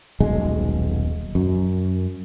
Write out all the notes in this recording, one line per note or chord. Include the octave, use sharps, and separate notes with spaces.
D#1 B1 G#3
F#2